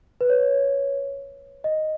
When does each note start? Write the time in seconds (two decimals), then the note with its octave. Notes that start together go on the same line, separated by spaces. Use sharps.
0.21 B4
0.30 C#5
1.64 D#5